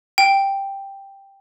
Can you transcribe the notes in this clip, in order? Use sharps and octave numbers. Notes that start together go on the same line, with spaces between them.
G5